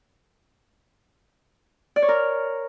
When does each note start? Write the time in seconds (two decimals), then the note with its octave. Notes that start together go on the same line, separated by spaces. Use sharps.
1.96 D5
2.02 C#5
2.09 A#4